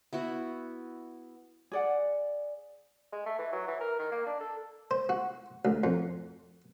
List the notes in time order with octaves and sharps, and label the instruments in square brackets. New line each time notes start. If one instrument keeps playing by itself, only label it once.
[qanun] B3 E4 F#4
[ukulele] G#4 D5 F#5
[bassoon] G#3
A3
E3
F#3
E3
A#4
D#3
A#3
D4
A4
[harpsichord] C5
F#4
D2
F2